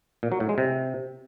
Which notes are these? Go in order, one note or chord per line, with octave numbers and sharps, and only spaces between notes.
A#2
F#3
A2
G#3
C3